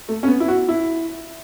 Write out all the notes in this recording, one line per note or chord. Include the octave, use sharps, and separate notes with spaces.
A3
C#4
B3
E4
F#4
E4